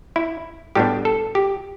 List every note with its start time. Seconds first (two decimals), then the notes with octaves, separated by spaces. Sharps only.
0.16 E4
0.75 A2 G3 B3 D4 G4
1.05 A4
1.35 G4